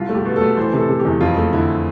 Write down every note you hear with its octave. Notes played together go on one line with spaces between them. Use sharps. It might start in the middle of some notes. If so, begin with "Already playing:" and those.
Already playing: C2 F4
A3
G4
B2
A3 A4
E3 C5
C3
A4
C3
G4
E2
F2 F4
A3
D3 E4